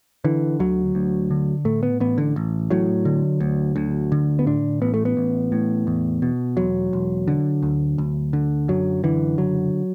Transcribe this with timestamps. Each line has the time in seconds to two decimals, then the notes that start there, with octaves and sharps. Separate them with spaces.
0.24 D3 E3
0.60 D2 F#3
0.95 D2
1.31 D3
1.65 A2 A3
1.83 B3
2.00 A1 B3
2.18 D3
2.36 A1
2.71 A2 F#3
3.05 D3
3.40 D2
3.76 D2
4.12 D3
4.39 B3
4.46 A2 D4
4.82 A1 B3
4.94 A3
5.05 B3
5.17 A1
5.52 A2
5.87 E2
6.22 B2
6.57 E1 F#3
6.93 E1
7.28 D3
7.63 D2
7.98 D2
8.33 D3
8.68 F#2 F#3
9.04 D3 E3
9.38 F#1 F#3